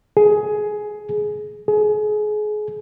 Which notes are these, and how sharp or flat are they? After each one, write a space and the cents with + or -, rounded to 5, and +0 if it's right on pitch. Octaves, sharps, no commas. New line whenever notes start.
G#4 +15
G#4 +30